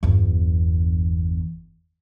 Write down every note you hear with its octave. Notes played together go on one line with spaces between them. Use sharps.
G1 E2